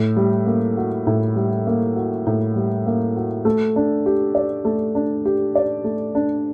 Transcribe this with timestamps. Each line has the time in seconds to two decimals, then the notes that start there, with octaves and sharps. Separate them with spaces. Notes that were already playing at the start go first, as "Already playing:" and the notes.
Already playing: A2
0.16 G3
0.46 A#3
0.77 F#4
1.07 A2
1.36 G3
1.67 A#3
1.96 F#4
2.27 A2
2.56 G3
2.86 A#3
3.16 F#4
3.45 A3
3.76 D4
4.06 G4
4.35 D5
4.65 A3
4.95 D4
5.25 G4
5.55 D5
5.84 A3
6.15 D4